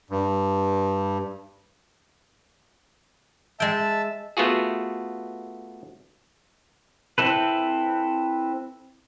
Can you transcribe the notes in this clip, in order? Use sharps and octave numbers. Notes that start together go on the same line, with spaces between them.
G2
G#3 E5 G5 A5
A3 B3 F4 F#4 G#4
C4 E4 A4 B4